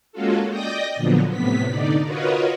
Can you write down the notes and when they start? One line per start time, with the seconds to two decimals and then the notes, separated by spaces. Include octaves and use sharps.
0.12 G#3 A#3 C#4 F4 F#4 A4
0.49 D5 D#5 G5 D#6 G6 A#6
0.96 A#2 D3 F3 F#3 B3
1.30 A2 C3 B3 B6
1.69 D3 D#4 D5
2.04 F4 F#4 A#4 B4 C#5 D#5